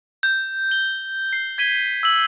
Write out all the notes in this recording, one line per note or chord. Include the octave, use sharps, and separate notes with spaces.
G6
G7
C7
G#6 B6 D#7 G7
E6 F#7